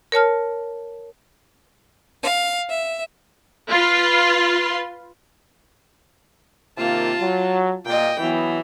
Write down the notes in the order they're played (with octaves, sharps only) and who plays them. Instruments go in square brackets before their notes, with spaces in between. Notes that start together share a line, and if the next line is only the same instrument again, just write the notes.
[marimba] A#4 C#5 A5 F6
[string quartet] F5
E5
[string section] F4 B4 C6
[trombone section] C3 D#3 A#3 [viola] F4 A5
[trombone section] F#3
[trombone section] A#2 [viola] D#5 G5
[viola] E3 [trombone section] F#3 B3